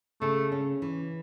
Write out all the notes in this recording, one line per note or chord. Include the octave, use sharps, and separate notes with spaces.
C#3 A3
C#4
E3